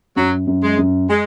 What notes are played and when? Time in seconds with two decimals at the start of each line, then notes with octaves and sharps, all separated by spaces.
0.16 F#2 F#3
0.47 F#2
0.63 G#3
0.78 F#2
1.09 G#3